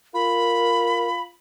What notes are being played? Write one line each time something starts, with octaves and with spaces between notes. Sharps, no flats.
F4 A#4 B5